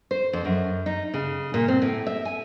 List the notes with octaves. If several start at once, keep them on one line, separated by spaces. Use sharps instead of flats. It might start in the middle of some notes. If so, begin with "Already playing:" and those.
C5
F2
F#2
D#4
C#3
A#2
C4
A2
E5
G#5